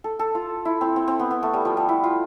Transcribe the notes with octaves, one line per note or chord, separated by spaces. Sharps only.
A4
A4
F4
E4
C4
C4
C4
B3
B3
A3
G3
F3
G3
E4
F4